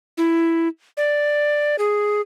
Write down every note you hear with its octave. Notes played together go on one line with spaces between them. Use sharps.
E4
D5
G#4